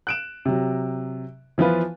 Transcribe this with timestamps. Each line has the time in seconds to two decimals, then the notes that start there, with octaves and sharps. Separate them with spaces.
0.07 F#6 D7 E7
0.45 C3 F#3
1.58 E3 F3 B3 F4 B4